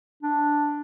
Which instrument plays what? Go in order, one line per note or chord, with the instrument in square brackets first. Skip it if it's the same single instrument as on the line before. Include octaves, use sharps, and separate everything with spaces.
[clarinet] D4